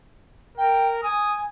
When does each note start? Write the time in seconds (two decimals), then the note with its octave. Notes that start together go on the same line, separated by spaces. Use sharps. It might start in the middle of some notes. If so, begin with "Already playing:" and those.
0.57 A#4 G5
1.03 G#5 D#6